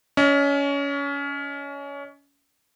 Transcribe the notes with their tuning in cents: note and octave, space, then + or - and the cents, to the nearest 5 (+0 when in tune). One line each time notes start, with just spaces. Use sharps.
C#4 +25 D#5 +10